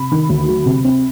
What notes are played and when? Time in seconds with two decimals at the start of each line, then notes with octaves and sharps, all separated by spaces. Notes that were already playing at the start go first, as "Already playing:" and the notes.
Already playing: C3 B5
0.11 D#3
0.29 D2
0.48 F#3
0.66 C3
0.84 C4